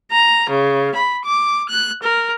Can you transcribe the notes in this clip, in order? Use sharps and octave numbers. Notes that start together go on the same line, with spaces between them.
A#5
C#3
B5
D6
F#6
A#4